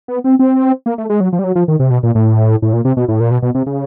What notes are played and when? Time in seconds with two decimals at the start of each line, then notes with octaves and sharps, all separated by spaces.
0.08 B3
0.24 C4
0.39 C4
0.86 A#3
0.98 A3
1.10 G#3
1.20 F#3
1.33 F3
1.39 G3
1.44 F#3
1.55 F3
1.68 D#3
1.79 C3
1.90 B2
2.03 A#2
2.15 A2
2.62 A2
2.73 A#2
2.85 C3
2.97 B2
3.08 A2
3.20 A#2
3.31 B2
3.42 B2
3.55 C3
3.66 C#3